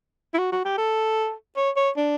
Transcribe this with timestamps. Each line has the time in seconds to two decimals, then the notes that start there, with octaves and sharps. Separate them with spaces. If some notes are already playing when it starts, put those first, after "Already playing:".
0.34 E4
0.38 F#4
0.52 F#4
0.65 G4
0.78 A4
1.56 C#5
1.76 C#5
1.97 D4